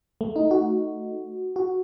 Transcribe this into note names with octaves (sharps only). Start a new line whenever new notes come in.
A3
D#4
F#4
F#4